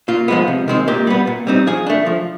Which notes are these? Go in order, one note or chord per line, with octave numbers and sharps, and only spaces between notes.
A#2 F4
F3 G#3 B3
C3
D#3 G#3 C4
A#2 G4
G3 B3
A#2
G3 C4 D#4
F3 G#4
A3 D4
F3